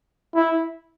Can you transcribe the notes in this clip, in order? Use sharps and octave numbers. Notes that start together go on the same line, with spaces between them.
E4